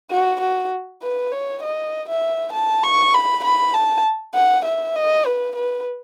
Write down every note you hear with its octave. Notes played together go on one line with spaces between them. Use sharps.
F#4
F#4
B4
C#5
D#5
E5
A5
C#6
B5
B5
A5
F#5
E5
D#5
B4
B4